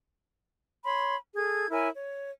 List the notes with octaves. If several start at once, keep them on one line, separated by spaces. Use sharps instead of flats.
C#5 B5 C6
G#4 A4 G#6
E4 A#4 C#5 G#5
C#5